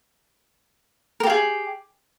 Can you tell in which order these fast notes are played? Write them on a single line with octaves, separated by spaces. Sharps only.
A#4 G4 F4 G#4